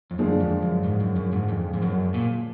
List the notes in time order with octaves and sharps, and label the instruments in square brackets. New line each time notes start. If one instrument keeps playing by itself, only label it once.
[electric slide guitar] F2
[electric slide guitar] F#2 [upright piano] D3 F3 G#3 D4 G#4
[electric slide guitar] F2
F#2
G#2
F#2
F#2
G#2
F2
G#2
F#2
A#2